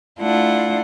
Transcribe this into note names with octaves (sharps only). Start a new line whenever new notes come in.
A3 D4 E4 F4 F#5